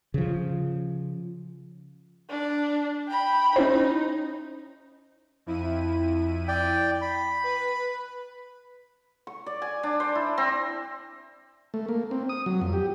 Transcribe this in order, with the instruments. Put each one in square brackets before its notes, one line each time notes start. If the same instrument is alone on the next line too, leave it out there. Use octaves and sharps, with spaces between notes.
[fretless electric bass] C#3 F3
[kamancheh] D4
G5 B5
[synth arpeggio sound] C#4 E4 C5 [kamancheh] D#4
[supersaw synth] F2 E4 D#7
[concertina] D5 G5
B5
[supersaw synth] B4
[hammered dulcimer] C#6
D5
G#5
D4
C5
E4
C4
[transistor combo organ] A3
A#3
C4
D#6
F#3
F2
G4